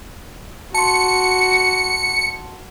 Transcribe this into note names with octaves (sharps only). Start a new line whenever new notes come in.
F#4 A5 C6 C#7